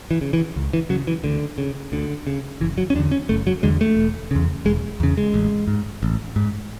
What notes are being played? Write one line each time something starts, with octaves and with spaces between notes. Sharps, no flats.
E3
C#3
E3
C#2
E3
C#3 F#3
E3
D2 D3
C#3
D2 D3
C#3
F#1 E3
F#3
C#4
E2 D3 D4
C#4
F#1 A3
F#3
E2 D3 G#3
A3
E1
E2 C#3
E1 G#3
E2 C#3
G#3
A1
G#2
A1
G#2